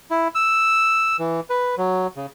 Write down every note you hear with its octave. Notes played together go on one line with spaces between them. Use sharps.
E4
E6
E3
B4
F#3
C#3